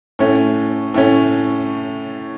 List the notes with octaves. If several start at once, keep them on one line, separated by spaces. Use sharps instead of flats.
A2 A3 C#4
A2 A3 C#4